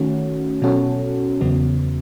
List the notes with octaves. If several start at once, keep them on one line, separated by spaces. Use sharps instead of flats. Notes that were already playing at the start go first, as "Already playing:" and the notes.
Already playing: D#3 A3 C#4 F#4
B2 F#3 C#4 F#4 A4
E2 C#3 F#3 B3